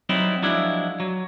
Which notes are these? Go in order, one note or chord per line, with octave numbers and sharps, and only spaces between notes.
F#3 G3 C4 D#4 E4
F3 F#3 G#3 D4 E4
F#3